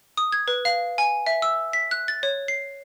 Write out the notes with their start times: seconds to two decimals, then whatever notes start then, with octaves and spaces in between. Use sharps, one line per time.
0.17 D#6
0.32 G#6
0.48 B4
0.65 F5
0.98 G#5
1.26 E5
1.42 E6
1.73 B6
1.91 F#6
2.08 A6
2.23 C#5
2.48 C7